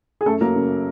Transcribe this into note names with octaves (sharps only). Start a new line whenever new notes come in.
G#4
F#2 A3 A4
F#3 A#3 A#4
C#3